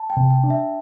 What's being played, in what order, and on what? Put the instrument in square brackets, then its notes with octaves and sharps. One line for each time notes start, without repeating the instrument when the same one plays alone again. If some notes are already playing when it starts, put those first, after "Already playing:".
Already playing: [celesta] A5
G5
[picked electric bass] C3
[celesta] G5
[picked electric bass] D4
[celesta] E5